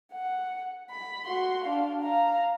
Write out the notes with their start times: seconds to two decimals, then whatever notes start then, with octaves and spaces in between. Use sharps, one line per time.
0.13 F#5
0.91 B5
1.27 F#4 C6
1.64 D4 F5
2.02 F5 A#5